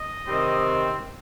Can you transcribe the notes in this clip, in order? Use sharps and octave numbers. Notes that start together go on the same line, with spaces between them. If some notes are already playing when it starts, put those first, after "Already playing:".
Already playing: D#5
C3 D#3 G3 C4